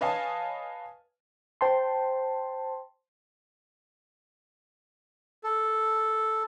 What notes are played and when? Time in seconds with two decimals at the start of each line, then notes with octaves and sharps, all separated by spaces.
0.01 B4 C#5 D#5 F5 G#5 A5
1.61 C5 G5 A5 C6
5.44 A4